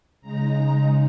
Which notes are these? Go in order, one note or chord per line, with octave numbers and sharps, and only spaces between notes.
C#3 G#3 D#4 A#5